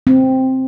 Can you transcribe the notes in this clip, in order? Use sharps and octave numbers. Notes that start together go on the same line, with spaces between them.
C4